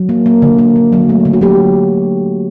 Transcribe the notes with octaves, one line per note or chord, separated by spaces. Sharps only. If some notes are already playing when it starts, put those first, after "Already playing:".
Already playing: F#3
A#3
A#3
D3
A#3
D3
F#3
A3
D3
F#4
F#3 G4